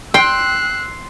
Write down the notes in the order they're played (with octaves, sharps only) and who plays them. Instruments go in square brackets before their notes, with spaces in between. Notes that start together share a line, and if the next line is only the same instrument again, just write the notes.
[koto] G5 [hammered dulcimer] C6 [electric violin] E6 F#6